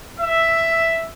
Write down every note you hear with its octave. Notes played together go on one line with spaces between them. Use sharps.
E5